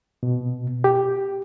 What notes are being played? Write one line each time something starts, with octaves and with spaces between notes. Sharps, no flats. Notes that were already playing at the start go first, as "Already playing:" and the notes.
B2
G4